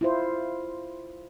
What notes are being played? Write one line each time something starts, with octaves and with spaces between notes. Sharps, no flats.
E4 F4 C5